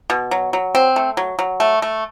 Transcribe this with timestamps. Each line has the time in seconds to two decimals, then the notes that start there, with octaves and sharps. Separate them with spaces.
0.10 B2
0.31 F#3
0.53 F#3
0.75 C4
0.96 A3
1.17 F#3
1.39 F#3
1.60 A3
1.82 A3